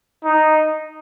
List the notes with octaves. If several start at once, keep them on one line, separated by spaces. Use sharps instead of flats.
D#4